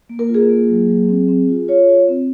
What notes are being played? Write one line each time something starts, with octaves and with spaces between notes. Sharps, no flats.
A#3
A#4
F4
G#4
A#3
F#3
F#3
C4
C4
F4
F4 C#5
F4
C4